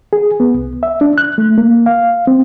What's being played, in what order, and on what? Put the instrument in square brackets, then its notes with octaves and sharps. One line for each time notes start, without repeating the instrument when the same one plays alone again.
[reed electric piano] G#4
B3
C2
E5
D4
F#6
A3
A#3
F5
C4